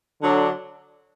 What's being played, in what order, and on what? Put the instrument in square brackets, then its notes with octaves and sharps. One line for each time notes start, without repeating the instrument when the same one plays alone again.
[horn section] D3 F#3 D4